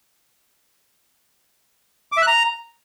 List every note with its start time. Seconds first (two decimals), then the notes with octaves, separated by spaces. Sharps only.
2.12 D6
2.17 E5
2.22 F#6
2.27 A#5